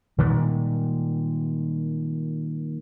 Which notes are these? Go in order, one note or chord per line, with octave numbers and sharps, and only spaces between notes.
A#2 D#3 G3 G#3